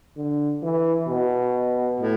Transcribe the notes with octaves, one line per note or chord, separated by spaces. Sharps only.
D3
E3
B2
A2